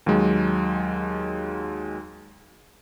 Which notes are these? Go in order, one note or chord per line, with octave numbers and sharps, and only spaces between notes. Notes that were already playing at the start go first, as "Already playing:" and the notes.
D#2 F#3 G#3